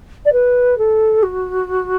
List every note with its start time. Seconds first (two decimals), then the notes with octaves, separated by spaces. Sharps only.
0.25 D5
0.33 B4
0.78 A4
1.23 F#4